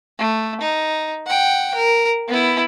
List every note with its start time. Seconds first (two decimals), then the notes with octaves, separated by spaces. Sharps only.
0.19 A3
0.61 D#4
1.27 F#5 G5
1.75 A#4
2.28 B3 E4